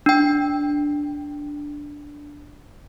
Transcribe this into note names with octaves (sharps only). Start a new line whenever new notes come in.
D4 G5